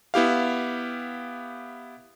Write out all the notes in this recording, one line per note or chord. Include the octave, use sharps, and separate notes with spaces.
B3 E4 G4 F5